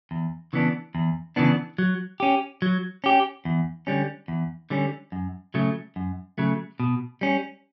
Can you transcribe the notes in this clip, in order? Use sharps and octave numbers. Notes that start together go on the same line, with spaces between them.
E2
C#3 E3 B3 D4
E2
C#3 E3 B3 D4
F#3
C#4 G4
F#3
C#4 G4
E2
D3 G3 C#4
E2
D3 G3 C#4
F#2
C#3 F#3 A3
F#2
C#3 F#3 A3
B2
G3 C#4